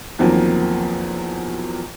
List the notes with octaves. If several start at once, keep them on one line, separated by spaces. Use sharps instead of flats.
E2 D#3 F3 F#3 A#3 C4